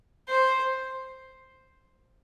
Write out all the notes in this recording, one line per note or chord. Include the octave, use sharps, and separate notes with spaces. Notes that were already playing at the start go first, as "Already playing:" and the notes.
C5